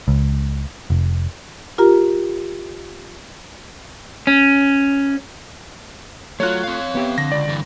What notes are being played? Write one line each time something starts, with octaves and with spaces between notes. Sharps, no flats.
C#2
F1
F4 G4 A#4 A#5
C#4
F#3 A3 F4 F#4 C#5 F#6
C4 F5
B3 G4 E5
D3 A#6
C#2 D5
G2 E3